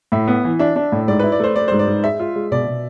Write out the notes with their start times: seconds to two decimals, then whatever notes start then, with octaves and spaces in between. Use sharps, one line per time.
0.12 A2 E5
0.28 B3
0.44 E3
0.59 D4 E5
0.76 D4
0.92 A2
1.08 G#2 D5
1.20 E4 B4
1.32 D5
1.40 A3 C5
1.56 A3 D5
1.68 G#2 C5
1.79 D5
1.87 G#2
2.03 G#3 E5
2.19 F4
2.36 G#3
2.52 B2 D5
2.67 B2